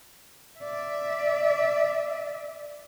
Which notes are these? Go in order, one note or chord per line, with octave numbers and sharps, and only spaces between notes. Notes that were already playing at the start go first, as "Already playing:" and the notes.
D5 E5